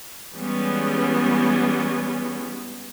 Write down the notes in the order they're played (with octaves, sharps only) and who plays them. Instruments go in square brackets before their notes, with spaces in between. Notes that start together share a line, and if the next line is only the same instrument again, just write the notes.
[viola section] E3 G3 G#3 B3 C#4